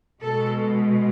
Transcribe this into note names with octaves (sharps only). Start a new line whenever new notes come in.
B2 G#3 A4